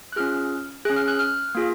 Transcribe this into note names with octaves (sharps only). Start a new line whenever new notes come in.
F#6
C#4 F4 G#4 F6
C#4 G#4 F#6
F6
F#6
F6
A#3 F4 G#4